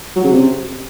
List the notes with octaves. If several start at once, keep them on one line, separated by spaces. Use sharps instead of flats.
F#3
C#3
C3